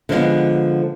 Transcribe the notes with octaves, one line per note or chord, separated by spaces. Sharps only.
D3 F3 G#3 B3